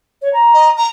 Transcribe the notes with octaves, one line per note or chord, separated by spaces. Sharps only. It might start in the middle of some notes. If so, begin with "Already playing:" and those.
C#5
A#5
D#5
A#5